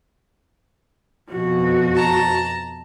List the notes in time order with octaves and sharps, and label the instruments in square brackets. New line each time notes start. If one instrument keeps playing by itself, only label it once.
[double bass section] F2 B2 [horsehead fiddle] F#4
[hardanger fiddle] A5 A#5